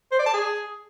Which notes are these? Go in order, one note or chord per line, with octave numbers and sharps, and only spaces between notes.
C5
D5
A5
G#4